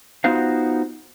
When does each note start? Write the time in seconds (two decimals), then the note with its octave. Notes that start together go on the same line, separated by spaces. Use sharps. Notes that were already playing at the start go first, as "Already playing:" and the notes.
0.24 B3 D#4 F4 F#4 C5 F5